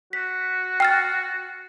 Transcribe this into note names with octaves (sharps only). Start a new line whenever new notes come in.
F#4 B6
G5 F6 A6